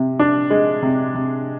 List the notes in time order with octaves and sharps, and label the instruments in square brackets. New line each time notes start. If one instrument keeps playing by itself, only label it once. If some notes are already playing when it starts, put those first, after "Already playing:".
Already playing: [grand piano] C3
D4
G#3
C3
C3